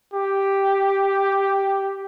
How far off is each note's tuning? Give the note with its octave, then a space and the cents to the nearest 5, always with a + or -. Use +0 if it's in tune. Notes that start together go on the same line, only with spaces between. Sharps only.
G4 +0